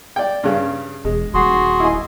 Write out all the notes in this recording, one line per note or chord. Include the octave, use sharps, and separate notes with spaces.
D5 G5
G2 C#3
E1 G#3
D#1 F#4 G#4 C6
E4 D#5 G#5